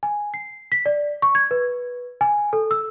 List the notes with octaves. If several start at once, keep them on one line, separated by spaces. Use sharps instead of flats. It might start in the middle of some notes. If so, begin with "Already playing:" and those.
G#5
C7
B6
D5
C#6
G#6
B4
G#5
A4
E6